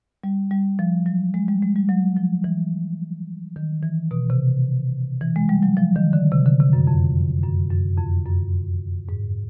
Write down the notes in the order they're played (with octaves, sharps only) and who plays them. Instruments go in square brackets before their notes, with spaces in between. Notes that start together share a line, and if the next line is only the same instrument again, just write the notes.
[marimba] G3
G3
F3
F#3
G#3
G3
G#3
G3
F#3
F3
E3
D#3
E3
B2
C3
E3
G#3
G3
F#3
F3
D#3
D3
C3
D3
C3
F#2
F2
F#2
F#2
F2
F#2
G#2